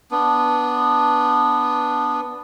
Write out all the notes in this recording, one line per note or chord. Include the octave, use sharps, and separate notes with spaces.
B3 D4